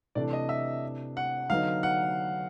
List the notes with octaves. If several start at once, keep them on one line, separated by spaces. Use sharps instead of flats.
C3 E3 A3 D4 D5
D#5
E5
F#5
D3 F#3 B3 D#4 F5
F#5